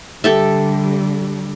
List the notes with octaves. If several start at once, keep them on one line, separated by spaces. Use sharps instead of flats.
D3 G3 G4 A4 E5